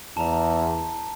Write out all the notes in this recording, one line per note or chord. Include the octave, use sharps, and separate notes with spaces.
E2 A5 A#5